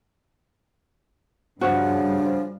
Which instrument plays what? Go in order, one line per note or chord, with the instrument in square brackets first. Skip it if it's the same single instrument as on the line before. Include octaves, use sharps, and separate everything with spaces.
[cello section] G2 [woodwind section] C#3 F3 [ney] D4 [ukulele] F#4